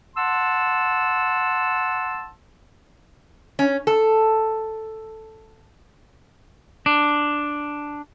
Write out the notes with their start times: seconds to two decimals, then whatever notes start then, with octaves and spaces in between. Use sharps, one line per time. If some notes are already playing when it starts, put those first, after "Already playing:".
0.16 F#5 A5 C6 E6
3.59 C#4
3.87 A4
6.86 D4